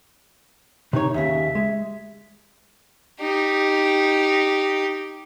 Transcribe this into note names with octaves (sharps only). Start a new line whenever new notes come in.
C3 D#4 C#5
D#2 C#3 E5
G#3
D#4 G4